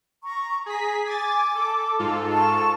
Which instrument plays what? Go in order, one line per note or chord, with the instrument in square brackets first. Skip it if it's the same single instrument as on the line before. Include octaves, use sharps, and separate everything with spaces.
[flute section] A#5 C#6
[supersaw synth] G#4 B6 [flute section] A#5
[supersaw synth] G#5 A6 [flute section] D6
[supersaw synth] A4
G#2 F4 A4
[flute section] A5 C#6